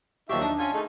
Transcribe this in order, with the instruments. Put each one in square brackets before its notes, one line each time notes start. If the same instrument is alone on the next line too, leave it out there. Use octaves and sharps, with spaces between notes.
[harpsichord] D#2 F3 F#3 [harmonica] D#4 E5 [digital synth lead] G4 [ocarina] C#6
[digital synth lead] D4 [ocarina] A5 [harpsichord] D#6
[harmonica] C#4 G#5 [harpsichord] F4
[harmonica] A3 D#4 G#4